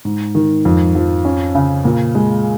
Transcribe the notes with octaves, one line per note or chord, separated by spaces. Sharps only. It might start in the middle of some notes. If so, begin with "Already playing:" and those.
G#2
D#3
F2
F3
C#4
C#3
A#2
G#3